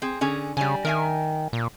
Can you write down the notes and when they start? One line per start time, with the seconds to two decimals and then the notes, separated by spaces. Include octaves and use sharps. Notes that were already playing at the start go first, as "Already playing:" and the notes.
0.02 C4 G#4
0.21 D3 C#4 G#4
0.57 C#3 G3 G#5
0.85 D#3 A#4 E5 G#5
1.53 A#2